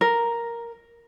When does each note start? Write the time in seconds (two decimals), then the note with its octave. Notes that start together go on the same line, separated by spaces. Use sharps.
0.01 A#4